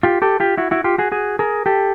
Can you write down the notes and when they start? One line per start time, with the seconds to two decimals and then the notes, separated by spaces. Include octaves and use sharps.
0.03 F4 G4
0.22 G4 A4
0.40 F4 G4
0.58 E4 F#4
0.71 E4 F#4
0.84 F4 G4
0.98 F#4 G#4
1.12 F#4 G#4
1.39 G#4 A#4
1.66 G4 A4